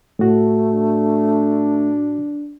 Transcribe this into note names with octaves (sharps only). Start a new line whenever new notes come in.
A2 A3 F#4
D4